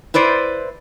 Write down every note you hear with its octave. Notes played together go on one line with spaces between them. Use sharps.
E4 B4 C5 D5